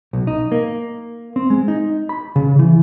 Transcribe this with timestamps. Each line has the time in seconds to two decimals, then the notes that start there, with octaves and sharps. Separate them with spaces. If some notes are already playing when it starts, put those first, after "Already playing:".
0.13 B1
0.27 D#4
0.52 A#3
1.36 C4
1.50 G#3
1.68 D#4
2.09 B5
2.36 C#3
2.59 E3